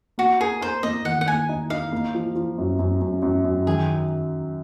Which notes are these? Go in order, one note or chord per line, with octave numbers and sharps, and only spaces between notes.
A#3 F#4
G#4 A#4
A#4 C5
A#3 D#5
D#3 F#5
F#5
A#3 G#5
D#4
D#4 F5
A#3
F3
F3
F#2
F#2
F#2
F#2
F#2
D#3 G#4